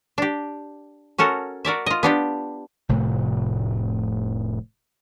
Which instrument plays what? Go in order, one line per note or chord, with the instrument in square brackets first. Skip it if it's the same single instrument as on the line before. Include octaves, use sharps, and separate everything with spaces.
[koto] D4 G4
C#4 F#4 A4 A#4
F#4 A#4 D5 E5
F4 D#5
B3 D4 G4
[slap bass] F1 A2 C3 A3